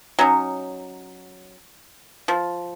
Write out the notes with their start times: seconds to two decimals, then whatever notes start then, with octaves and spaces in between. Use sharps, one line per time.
0.19 F#3 C#4 D#4
2.28 F3